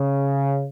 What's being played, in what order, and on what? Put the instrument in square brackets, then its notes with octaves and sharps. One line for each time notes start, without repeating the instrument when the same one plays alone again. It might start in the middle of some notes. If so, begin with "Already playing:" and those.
Already playing: [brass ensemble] C#3